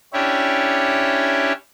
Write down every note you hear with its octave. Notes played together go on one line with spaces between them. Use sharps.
C#4 D4 E4 G4 C#5